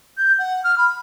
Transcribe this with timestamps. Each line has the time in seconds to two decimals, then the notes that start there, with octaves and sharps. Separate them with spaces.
0.18 G6
0.39 F#5
0.64 F6
0.78 B5